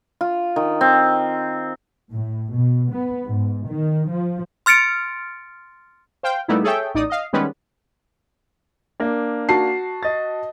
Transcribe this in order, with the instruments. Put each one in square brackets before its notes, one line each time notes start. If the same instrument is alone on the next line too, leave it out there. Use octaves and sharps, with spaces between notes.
[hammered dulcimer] F4
D#3
C4
[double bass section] A2
B2
B3
G#2
D#3
F3
[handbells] C6 F6 A6 C#7 D7
[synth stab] C5 F5 G5
A#2 G3 A3 B3 D#4 E4
G#4 A4 C#5 E5 G5
A1 D#4 D5 D#6
D#5 F5
D#3 G3 G#3 B3 C#4 B4
[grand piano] A#3 D4
[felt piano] F#4 A5 C7
[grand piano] D#5 A6